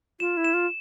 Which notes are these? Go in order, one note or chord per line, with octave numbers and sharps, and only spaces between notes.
F4 E7
E4
E7
F4